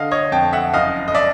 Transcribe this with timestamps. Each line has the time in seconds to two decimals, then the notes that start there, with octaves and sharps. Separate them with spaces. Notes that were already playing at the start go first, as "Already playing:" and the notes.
Already playing: D3 D#5 F5
0.11 C#5 D#5
0.32 F2 G5 A5
0.53 E5 F#5
0.74 F#1 D#5 F5
1.08 D#5
1.14 D5 E5